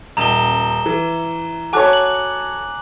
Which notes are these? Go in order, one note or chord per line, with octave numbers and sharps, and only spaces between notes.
D#1 A#5 E7 G7
E3
F#4 A4 C#5 G#5 D6 F#6
F#7